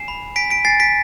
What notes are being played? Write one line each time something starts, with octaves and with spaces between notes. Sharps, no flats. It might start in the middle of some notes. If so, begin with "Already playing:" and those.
Already playing: G#5 C7 E7
B5
G#5 B6 D7
B6 D7
G#5 A6 C7
B6 D7